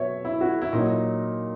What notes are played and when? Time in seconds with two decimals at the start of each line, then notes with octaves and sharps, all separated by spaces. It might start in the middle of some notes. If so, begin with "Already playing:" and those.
Already playing: B2 F#3 C#5 E5
0.25 E4
0.41 F#4
0.62 E4
0.73 A#2 F#3 D#4